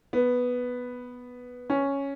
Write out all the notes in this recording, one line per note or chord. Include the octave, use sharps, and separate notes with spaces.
B3
C#4